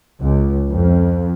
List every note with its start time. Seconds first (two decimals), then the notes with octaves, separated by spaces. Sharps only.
0.21 C#2
0.70 F2